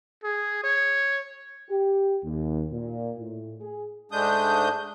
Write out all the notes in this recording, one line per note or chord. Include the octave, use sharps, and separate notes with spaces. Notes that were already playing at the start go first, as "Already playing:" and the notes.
G#4
C#5
G4
D#2
A#2
A2
G#4
G#2 G#3 A3 D4 D#6 G6